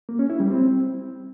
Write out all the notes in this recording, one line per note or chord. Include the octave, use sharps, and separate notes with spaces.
A#3
C#4
E4
G3
C4